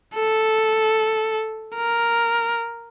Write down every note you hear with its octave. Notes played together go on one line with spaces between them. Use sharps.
A4
A#4